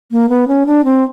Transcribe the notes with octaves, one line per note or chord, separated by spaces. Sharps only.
A#3
B3
C#4
D4
C4